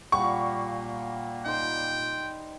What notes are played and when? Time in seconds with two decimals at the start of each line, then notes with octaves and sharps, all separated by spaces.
0.12 A#2 G3 A#3 C5 F#5 C#6
1.45 D#4 C5 G5